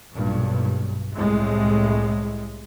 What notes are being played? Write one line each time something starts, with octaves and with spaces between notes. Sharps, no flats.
B1 G2 A#2
C2 A2 C3 G#3